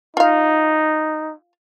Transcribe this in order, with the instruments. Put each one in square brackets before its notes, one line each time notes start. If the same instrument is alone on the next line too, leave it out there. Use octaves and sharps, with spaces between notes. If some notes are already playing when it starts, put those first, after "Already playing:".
[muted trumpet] D#4 [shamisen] F4 F5